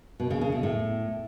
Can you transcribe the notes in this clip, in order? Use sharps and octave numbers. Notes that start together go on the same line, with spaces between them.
B2
C#3
C#3
B2
A2